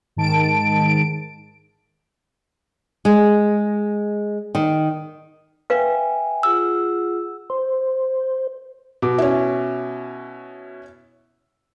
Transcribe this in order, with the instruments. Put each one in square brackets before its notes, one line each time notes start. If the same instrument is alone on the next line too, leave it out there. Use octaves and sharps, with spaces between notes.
[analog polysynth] G#2 D#3 A5 D7
[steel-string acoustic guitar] G#3
D#3
[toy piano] B4 F5 [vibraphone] E5 G5 G#5
[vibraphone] F4 G#4 F#5 [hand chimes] E6
[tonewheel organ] C5
[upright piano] B2 D6
[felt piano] C#4 E4